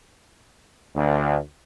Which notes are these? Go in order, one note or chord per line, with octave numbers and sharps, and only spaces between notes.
D2